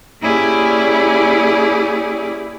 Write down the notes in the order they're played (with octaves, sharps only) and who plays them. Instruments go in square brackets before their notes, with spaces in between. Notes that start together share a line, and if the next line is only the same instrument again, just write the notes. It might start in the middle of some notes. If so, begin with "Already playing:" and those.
[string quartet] A#3 C#4 E4 G4 G#4 D5